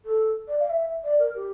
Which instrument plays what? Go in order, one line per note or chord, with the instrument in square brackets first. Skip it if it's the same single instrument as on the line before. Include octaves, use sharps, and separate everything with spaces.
[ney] A4
D5
F5
E5
D5
A#4
G4